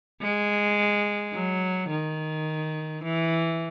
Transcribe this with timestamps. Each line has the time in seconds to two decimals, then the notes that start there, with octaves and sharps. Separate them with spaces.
0.22 G#3
1.34 F#3
1.90 D#3
3.04 E3